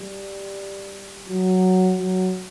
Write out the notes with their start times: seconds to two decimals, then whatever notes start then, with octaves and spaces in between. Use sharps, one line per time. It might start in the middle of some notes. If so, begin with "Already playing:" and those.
Already playing: G3
1.28 F#3
1.99 F#3